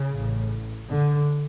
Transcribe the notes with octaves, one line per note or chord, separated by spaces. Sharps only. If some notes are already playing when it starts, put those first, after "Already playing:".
Already playing: C#3
A1 A2
D3